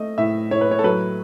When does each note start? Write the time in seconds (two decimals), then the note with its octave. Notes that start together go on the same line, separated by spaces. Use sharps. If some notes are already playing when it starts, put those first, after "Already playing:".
Already playing: A3 D#5
0.18 A2 E5
0.51 A2 C#5
0.61 B4
0.71 C#5
0.79 A4
0.84 F#3 B4